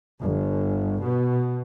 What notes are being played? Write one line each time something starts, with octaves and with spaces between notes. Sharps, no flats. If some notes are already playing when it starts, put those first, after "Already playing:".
G1
B2